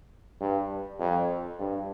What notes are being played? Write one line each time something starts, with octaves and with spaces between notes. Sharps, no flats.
G2
F2
G2